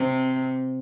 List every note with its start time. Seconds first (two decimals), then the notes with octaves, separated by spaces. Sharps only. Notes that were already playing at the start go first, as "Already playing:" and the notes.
Already playing: C3